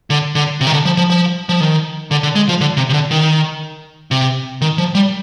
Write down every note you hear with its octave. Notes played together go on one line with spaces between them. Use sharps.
D3
D3
C3
D#3
D3
F3
F3
F3
F3
D#3
D3
D3
G#3
F3
D3
C3
C3
D3
D#3
C3
D#3
F3
G3